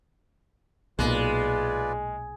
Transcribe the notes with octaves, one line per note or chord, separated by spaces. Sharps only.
B1 A#2 G#3 F4 B4 D5